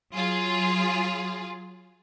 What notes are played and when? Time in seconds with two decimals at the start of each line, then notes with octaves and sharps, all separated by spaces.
0.14 F#3 F4 G#4